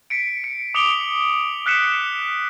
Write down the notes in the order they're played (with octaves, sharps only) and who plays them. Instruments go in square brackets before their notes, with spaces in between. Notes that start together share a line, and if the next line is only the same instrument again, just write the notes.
[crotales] B6 C#7 D7
C#7
D6 D#6 C#7 D7 F7 G7
F6 F#6 B6 C#7 E7